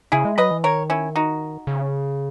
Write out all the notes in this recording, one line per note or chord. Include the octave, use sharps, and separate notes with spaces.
C#3 E4 G#4
G#3
F#3 B4 D#5
E3
D#3 A#4 C#5
C#4 E4
D#4 F#4
C#3